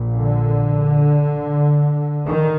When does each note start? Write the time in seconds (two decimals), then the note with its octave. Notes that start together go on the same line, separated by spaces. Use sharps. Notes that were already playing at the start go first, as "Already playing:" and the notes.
Already playing: A#1 A#2
0.16 D3
2.28 D#3